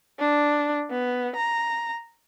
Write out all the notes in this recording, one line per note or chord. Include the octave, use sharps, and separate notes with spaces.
D4
B3
A#5